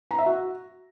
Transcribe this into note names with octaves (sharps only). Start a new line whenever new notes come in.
A#5
E5
F#4